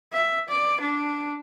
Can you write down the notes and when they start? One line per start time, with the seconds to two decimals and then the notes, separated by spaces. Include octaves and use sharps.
0.13 E5
0.49 D5
0.81 D4